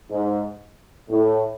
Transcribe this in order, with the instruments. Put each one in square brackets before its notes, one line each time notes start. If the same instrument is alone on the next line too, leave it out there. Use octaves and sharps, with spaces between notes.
[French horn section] G#2
A2